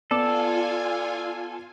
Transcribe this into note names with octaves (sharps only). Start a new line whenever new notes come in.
B3 F4 A4 D5 G#5 D6 E7